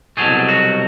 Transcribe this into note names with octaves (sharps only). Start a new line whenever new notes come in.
C2 B2 F#3 A3 G#4
F#4